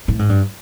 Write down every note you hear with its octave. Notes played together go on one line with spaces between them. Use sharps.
A2
G#2
G2